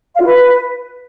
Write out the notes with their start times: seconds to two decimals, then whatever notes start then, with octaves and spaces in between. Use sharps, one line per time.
0.15 F5
0.20 F4
0.25 B4